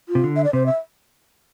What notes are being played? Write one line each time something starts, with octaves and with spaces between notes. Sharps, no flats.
F4
C3
D3
E5
D5
C3 C5
E5